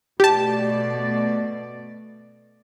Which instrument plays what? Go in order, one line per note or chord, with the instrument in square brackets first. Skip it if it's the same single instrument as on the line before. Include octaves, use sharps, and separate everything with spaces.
[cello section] B2 A3 D5 [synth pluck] G4 A5